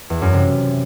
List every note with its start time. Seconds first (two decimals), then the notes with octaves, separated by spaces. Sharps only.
0.10 E2
0.22 F#2
0.33 C3